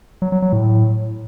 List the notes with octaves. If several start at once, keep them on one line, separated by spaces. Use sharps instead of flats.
F#3
F#3
F#3
A2